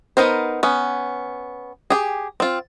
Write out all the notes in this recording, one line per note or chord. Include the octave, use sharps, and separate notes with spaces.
B3 D#4 A#4 C5
B3 C#4
G4 G#4
C4 F4